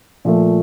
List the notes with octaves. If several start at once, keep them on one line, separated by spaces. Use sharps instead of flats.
A#2 F3 A3